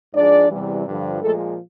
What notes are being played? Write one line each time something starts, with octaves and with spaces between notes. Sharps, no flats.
G#2 F3 G#3 D4 D5
E2 C3 E3 G3
G2 D3 F3
A#2 F3 G#3 A3 A4